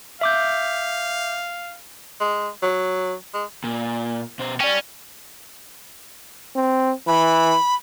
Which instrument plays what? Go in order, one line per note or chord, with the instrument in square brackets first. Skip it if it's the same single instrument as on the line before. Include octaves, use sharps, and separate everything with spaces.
[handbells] E5 D6 G6 [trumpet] F5
[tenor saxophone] G#3
F#3
G#3
[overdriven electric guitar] A#2
B2 C5
[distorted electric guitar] C#4 [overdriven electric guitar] D5 G5
[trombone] C4
[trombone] E3 [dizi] B5